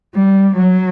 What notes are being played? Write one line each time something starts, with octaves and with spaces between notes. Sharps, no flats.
G3
F#3